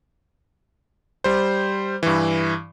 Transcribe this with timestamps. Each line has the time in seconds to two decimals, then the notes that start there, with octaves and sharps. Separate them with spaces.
1.24 G3 C5
2.03 G2 E3